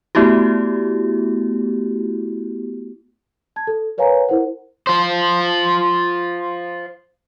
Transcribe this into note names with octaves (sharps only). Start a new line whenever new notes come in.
A3 B3 E4 F#4 G4
A5 G#6
A4
A#4 B4 C#5 F5 G#5 A#5
E4 A#4 C5 F#5
F4 C5